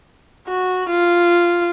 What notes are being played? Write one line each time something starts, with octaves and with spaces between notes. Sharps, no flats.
F#4
F4